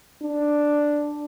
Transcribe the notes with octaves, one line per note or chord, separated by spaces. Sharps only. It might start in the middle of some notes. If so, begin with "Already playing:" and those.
D4